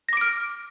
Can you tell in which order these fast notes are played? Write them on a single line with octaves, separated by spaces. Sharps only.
A#6 D6 D7 F6